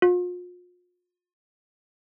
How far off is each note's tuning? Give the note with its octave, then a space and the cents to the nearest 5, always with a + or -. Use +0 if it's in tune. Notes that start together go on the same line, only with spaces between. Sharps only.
F4 +40